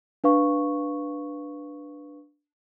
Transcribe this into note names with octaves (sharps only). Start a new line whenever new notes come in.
D4 B4 F5 C#6